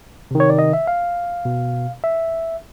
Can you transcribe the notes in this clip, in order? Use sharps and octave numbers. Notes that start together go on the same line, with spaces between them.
C3 D#3
C#5
D5
D#5
E5
F5
B2
E5